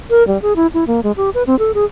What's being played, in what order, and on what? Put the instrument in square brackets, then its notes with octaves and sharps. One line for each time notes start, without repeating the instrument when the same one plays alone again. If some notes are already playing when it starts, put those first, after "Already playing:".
[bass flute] A#4
G3
G#4
E4
E4
A#3
G#3
G4
B4
C4
A4
G#4